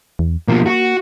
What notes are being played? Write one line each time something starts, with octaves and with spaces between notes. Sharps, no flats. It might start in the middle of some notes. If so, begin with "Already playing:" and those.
E2
B2 F3 A#3
F#4